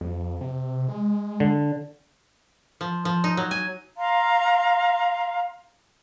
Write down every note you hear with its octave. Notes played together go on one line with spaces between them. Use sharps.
F2
C3
G#3
D3
F3
F3
D#4
F#3
G#5
F5 A#5 C6